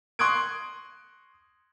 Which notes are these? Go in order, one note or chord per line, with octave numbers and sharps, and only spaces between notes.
C6 C#6 D#6 F#6 G#6 D7